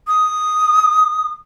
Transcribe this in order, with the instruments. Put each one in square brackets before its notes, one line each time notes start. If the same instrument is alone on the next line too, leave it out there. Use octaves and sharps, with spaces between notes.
[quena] D#6